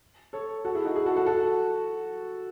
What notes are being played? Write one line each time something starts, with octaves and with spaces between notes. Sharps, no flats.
A4 C#5
F#4 A4
E4 G#4
D#4 F#4
E4 G#4
F#4 A4
F#4 A4
F#4 A4